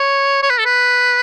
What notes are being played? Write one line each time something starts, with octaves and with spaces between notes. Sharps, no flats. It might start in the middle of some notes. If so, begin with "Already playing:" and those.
Already playing: C#5
C#5
B4
A4
B4